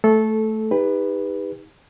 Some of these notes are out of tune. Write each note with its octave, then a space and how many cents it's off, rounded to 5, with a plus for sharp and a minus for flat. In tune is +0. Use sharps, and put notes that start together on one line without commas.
A3 +0 A4 -15
D#4 +20 G4 +35 B4 +0